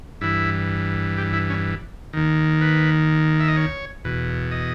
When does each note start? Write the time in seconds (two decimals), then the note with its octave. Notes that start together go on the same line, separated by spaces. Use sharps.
0.21 G2 E3 E4
1.18 G4
1.33 E4
1.50 C#4
2.13 D#2 D#3
2.61 B4
3.40 E5
3.48 D#5
3.57 C#5
4.04 E2 B2
4.51 D#5